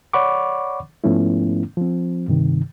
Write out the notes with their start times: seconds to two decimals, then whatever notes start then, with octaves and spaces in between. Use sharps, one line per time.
0.13 C#5 D5 F#5 B5 C#6 D6
1.04 G#2 F3 A3 B3 C#4 E4
1.77 F3 C4
2.28 G2 C3 D#3